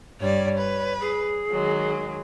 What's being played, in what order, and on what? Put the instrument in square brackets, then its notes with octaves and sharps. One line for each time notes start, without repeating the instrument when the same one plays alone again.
[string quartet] G2 G3 D5 [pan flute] C#5
[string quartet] B4
[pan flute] G#4
[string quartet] D#3 F#3 G#3